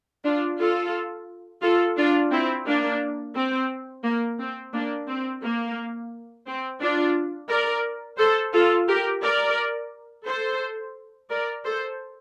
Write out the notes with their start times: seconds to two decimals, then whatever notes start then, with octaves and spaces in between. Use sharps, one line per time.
0.24 D4 F4
0.58 F4 A4
1.62 F4 A4
1.97 D4 F4
2.31 C4 E4
2.66 A#3 D4
3.35 C4
4.04 A#3
4.39 C4
4.73 A#3 D4
5.07 C4
5.42 A#3
6.47 C4
6.80 D4 F4
7.49 A#4 D5
8.18 A4 C5
8.53 F4 A4
8.88 G4 A#4
9.22 A#4 D5
10.25 A4 C5
11.30 A#4 D5
11.64 A4 C5